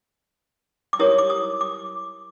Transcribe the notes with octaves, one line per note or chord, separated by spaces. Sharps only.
D6
E4 G4 A#4 C#5 D#6
D6
D#6
D6